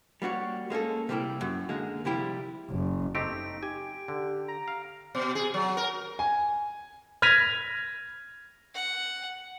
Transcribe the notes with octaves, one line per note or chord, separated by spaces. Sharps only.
G3 A#3 F#4 C#5
G#3 A#3 C#4 A4
C3 G3 A#3 B3 E4 G4
F#2
D3 G#3 A#3
C3 F3 G3 E4 G4
F#1
A3 C4 D#4 G4 D7
G4 G#5
D3
A#5
F5
B2
G#4
F#3
A#4
G#5
F6 G#6 A#6 B6 D#7 F7
F#5